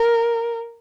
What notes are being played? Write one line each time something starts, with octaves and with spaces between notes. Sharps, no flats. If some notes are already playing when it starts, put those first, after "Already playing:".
Already playing: A#4